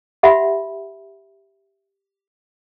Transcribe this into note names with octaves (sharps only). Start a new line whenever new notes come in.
G4 E5 F#5 B5